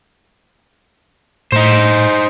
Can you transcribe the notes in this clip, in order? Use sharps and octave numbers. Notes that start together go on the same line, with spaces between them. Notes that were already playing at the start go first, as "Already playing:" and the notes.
A2 D#4 C5